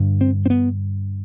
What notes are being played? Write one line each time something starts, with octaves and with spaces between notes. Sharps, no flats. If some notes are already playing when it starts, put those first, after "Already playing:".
Already playing: G2 D3
C4
C4
B3